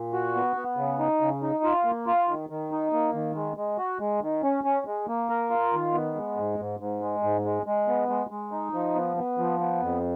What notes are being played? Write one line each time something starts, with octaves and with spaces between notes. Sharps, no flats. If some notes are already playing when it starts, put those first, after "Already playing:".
Already playing: A#2
F#4
B3
B3
C#3
D#4
C#3
D#4
F4
A#3
F4
D#3
D#3
D#4
A#3
D#3
G#3
G#3
F#4
G#3
D#3
C#4
C#4
G#3
A#3
A#4
F4
D#3
B3
G#3
G#2
G#2
G#2
G#3
G#2
G#3
G#3
B3
G#3
G#3
D#4
F3
B3
B3
F3
B3
F2